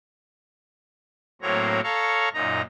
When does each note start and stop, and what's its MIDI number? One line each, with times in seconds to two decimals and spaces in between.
1.42 1.81 45
1.42 1.81 54
1.42 1.81 58
1.42 1.81 60
1.42 1.81 73
1.42 1.81 82
1.84 2.29 69
1.84 2.29 73
1.84 2.29 77
1.84 2.29 82
1.84 2.29 85
2.34 2.62 42
2.34 2.62 46
2.34 2.62 63
2.34 2.62 82